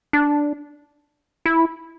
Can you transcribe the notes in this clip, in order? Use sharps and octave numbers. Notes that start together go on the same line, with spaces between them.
D4
E4